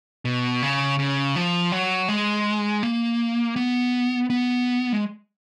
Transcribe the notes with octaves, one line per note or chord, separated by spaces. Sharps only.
B2
C#3
C#3
F3
F#3
G#3
A#3
B3
B3
G#3